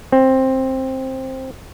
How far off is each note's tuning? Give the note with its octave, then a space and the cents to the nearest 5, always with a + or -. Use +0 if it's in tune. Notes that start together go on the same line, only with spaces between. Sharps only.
C4 +10